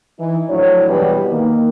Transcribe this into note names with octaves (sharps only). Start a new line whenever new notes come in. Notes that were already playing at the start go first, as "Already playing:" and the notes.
E3 D#4
A2 F3 F#3 D4 C#5
B2 E3 G3 G#3 B3
D#3 A#3